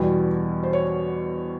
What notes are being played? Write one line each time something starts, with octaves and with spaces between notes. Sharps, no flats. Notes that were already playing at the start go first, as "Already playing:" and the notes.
Already playing: E2 B2 G3
C5
C#5